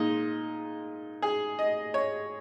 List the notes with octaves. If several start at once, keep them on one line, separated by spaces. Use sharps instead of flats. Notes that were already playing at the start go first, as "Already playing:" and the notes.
Already playing: A#2 G#3 D#4
G#4
D#5
C#5